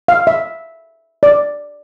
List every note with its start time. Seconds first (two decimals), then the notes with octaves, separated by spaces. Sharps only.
0.08 F5
0.27 E5
1.23 D5